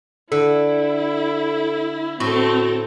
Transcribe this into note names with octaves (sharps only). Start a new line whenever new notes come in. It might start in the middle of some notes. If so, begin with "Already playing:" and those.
D3 E4 A4
A2 C4 F#4 A4